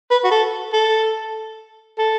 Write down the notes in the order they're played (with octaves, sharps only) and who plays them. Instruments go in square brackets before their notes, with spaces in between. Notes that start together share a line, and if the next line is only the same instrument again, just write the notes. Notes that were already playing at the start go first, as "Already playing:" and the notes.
[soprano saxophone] B4
F#4
A4
A4
A4